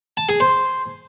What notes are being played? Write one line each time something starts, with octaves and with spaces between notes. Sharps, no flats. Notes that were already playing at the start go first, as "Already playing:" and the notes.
A5
G#4
C5